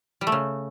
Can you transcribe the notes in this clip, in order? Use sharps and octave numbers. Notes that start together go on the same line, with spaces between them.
G3
A3
C#3